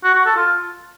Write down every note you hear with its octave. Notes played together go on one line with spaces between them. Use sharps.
F#4
F#4
A4
F4